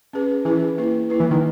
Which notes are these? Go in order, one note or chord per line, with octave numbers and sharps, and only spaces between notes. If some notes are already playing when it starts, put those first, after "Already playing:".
C#4 G#4 B4
E3 C#4 G#4 B4
A#3 E4 B4
A#3 E4 B4
E3
D#3